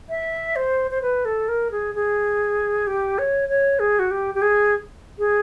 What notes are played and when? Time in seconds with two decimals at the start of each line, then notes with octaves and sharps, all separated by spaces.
0.10 E5
0.56 C5
0.91 C5
1.02 B4
1.25 A4
1.49 A#4
1.71 G#4
1.95 G#4
2.87 G4
3.19 C#5
3.49 C#5
3.79 G#4
3.99 F#4
4.11 G4
4.35 G4
4.42 G#4
5.19 G#4